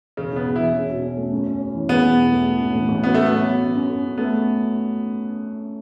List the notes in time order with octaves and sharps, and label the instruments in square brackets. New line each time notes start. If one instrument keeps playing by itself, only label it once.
[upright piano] E1 [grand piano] C#3
[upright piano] E1 [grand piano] B3
[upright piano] E2
[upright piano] E2 [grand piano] E4
[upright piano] C#4
B2
C#4
A3
F#2
C#4
C#4
E3
[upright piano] E2 [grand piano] B3
[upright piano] E1
E1
A3
E3
A1
A2
A1
[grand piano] B3 [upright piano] F#4
[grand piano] A3 [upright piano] F#4
[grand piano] B3
[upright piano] F#3
F#4
F#2
F#2
A4
F#2
[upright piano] A3 [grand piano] B3
[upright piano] A3